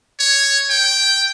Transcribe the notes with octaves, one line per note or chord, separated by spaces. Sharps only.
C#5
G5